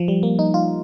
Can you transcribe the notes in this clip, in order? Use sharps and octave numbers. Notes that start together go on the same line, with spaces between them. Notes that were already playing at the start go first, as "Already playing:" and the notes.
Already playing: F3
G3
A#3
D#4
F4